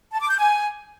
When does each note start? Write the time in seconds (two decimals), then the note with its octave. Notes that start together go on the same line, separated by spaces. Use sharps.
0.12 A5
0.21 D6
0.30 G6
0.38 G#5